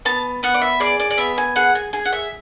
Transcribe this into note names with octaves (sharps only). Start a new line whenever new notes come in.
B3 A5
B3 F#5
D5
E5
G#4 D5
D5
D5
B3 E5
G#5
G#4 F#5
G#5
G#4 G#5
F#5
E5